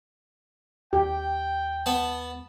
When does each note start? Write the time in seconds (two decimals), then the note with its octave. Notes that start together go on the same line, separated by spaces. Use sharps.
0.93 D#2 G4 G5
1.86 B3 A5